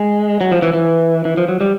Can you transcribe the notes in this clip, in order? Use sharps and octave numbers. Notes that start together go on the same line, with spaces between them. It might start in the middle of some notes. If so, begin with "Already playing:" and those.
Already playing: G#3
F#3
F3
E3
E3
E3
F3
F#3
G3